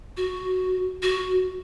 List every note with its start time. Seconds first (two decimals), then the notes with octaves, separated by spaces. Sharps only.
0.17 F#4
1.03 F#4